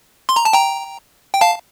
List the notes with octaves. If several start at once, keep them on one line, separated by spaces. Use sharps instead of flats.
C6
A#5
A5
G5 A#5
G5
F5 A5